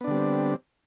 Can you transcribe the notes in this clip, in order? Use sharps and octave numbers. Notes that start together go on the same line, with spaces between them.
D3 G3 B3 C4 D4